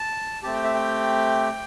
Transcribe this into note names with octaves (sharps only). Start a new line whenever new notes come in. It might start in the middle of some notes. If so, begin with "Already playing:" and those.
Already playing: A5
A3 C4 G4 A5
G5
E5
G5